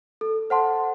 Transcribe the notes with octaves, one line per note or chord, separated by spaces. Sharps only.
A4
C5 F#5 A5 C6